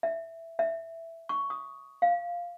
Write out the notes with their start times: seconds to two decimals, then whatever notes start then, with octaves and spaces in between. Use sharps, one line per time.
0.03 E5
0.59 E5
1.29 C#6
1.50 D#6
2.02 F5